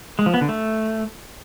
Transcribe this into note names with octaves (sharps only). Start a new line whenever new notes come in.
G#3
F3
B3
D3
A3